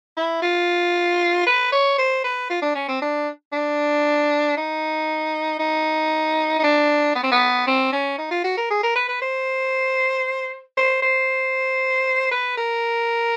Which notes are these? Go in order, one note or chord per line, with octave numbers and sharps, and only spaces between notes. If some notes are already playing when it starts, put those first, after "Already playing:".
E4
F4
B4
C#5
C5
B4
F4
D4
C#4
C4
D4
D4
D#4
D#4
D#4
D4
B3
C4
B3
C4
C#4
D#4
F4
F#4
A#4
G#4
A#4
B4
B4
C5
C5
C5
B4
A#4